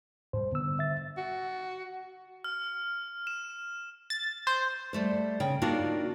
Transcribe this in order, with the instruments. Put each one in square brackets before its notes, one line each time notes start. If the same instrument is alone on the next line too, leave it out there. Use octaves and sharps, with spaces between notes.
[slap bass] G#2 G3 [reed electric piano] C5
[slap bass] D3 D#3 G3 [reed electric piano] B3 E6
[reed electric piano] E5 A6
[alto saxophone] F#4
[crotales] F6
E7
[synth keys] A6
C5
[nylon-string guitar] G3 A3 C5
C#3 G5
A#3 D4 D#4 F4 F#4